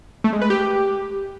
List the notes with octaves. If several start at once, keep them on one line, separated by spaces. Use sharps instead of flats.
A3
G#3
B4
G4